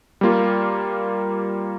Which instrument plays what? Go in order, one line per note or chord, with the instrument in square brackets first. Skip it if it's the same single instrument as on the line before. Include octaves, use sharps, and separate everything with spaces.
[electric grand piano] G3 A#3 F4